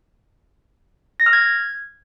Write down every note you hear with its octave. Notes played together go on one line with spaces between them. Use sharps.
A#6
F6
G#6